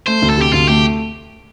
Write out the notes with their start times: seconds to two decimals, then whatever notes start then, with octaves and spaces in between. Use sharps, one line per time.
0.07 A3 C5
0.22 D2
0.30 A4
0.38 C3 G4
0.53 D2 F4
0.68 A3 G4